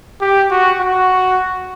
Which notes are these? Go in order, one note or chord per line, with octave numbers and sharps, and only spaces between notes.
G4
F#4
F#4